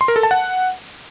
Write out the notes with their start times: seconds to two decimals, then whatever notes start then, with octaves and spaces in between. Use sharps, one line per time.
0.01 C6
0.08 A#4
0.16 A4
0.23 A5
0.31 F#5